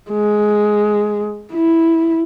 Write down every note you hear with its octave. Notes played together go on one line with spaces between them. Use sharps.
G#3
E4